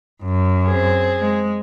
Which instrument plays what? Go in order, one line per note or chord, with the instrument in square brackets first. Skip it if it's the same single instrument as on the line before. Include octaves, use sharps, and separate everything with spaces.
[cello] F#2
[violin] C4 G#4
[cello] G#3